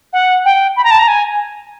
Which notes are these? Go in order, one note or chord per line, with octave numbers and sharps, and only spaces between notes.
F#5
G5
B5
A#5
A5
A#5
G#5